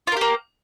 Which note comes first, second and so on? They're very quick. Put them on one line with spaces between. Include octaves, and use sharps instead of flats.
F4 A#4 G4 A#3